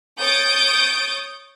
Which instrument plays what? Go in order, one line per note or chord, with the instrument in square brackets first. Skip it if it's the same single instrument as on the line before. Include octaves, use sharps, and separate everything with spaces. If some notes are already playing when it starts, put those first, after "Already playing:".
[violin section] C#5 D#6 G6 A6 D7